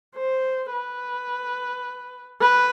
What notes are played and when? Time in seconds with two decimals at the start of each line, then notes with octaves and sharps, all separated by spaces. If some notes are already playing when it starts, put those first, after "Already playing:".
0.16 C5
0.72 B4
2.41 B4